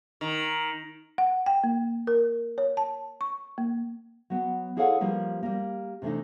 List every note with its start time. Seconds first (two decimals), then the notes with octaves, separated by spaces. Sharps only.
0.21 D#3
1.18 F#5
1.46 G5
1.64 A#3
2.07 A#4
2.58 C#5
2.77 A5
3.21 C#6
3.58 A#3
4.30 F#3 B3
4.77 E4 G#4 A4 C#5 F5 F#5
5.01 F3 G3 A#3 B4
5.43 G3 A#3
6.02 C3 E3 A3 D4 D#4